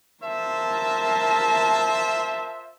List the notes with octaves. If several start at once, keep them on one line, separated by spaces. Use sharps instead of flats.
F4 A#4 C5 E5 A5